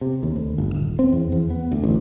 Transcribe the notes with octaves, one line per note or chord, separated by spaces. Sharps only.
C3
D#2
D2
G1
D#1
C4
E2
E2
B3
D2
A1